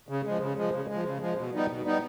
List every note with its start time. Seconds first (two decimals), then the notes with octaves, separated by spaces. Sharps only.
0.09 C#3
0.25 F3 G#3
0.40 C#3
0.57 F3 G#3
0.73 C#3
0.88 G#3
0.94 F3
1.05 C#3
1.21 F3 G#3
1.38 B2
1.54 G3 B3 D#4
1.69 B2
1.85 G3 B3 D#4